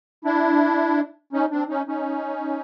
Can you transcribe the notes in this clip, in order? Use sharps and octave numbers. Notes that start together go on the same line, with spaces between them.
D4 E4
C#4 D#4
C4 D4
C#4 D#4
C#4 D#4